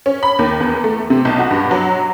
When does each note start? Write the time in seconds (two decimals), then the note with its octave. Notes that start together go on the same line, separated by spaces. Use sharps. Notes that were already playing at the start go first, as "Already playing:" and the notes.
0.06 C#4
0.23 B5
0.39 D#2
0.60 E2
0.84 A3
1.10 C3
1.25 B1
1.39 F#4
1.51 G2
1.71 F#3